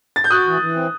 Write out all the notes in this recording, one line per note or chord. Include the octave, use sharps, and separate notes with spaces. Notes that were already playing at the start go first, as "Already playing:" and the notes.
A6
G6
F#4 D#6 F#6
E3
E3
C4